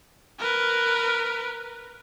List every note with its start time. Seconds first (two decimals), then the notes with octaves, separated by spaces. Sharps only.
0.39 A#4 B4